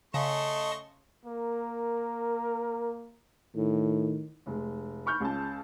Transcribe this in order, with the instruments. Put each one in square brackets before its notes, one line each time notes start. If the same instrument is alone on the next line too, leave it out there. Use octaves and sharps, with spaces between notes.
[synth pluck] C#3 [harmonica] A3 C6 C#6 [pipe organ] D#5 A5 D#6
[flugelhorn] A#3 [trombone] A#4
[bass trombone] A2 [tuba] D#3
[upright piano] F1 G#3
B5 C#6 F6 G6
C#2 C#3 A5